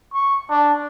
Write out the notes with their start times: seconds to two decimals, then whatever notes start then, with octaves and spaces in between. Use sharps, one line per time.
0.13 C#6
0.50 D4